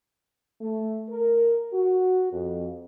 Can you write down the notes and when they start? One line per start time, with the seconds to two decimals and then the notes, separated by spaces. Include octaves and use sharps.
0.61 A3
1.09 A#4
1.72 F#4
2.32 F2